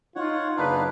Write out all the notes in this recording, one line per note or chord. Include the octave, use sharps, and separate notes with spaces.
D#4 F4 C#5 F#5
F#1 D4 D#4 B4 F5